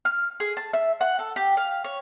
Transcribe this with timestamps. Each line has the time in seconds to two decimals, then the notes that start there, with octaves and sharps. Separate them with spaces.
0.05 F6
0.40 G#4
0.57 A5
0.73 E5
1.01 F#5
1.19 A4
1.36 G4
1.57 F5
1.84 C#5